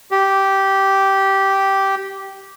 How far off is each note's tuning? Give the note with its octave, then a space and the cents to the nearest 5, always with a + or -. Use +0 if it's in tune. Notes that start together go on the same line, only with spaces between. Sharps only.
G4 -10